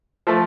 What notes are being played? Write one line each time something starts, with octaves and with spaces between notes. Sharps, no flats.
F3 A3